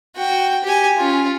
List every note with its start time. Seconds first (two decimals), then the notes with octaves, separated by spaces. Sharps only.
0.16 F#4 G5
0.64 G4 G#5
0.98 C#4 F4